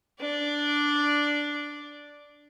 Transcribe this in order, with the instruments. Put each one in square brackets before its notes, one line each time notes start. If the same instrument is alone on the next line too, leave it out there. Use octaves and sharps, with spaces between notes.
[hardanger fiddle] D4 D5